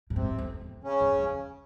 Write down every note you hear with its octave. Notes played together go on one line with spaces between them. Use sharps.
A2
G#2 C3 C4
F2
E2
C#3 C#4
F2
F2